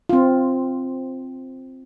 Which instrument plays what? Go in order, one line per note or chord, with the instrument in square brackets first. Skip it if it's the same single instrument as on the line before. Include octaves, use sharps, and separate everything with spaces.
[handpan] C4 F4